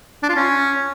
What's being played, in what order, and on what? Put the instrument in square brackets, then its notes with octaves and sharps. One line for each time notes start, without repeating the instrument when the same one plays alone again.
[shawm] D4
F4
C#4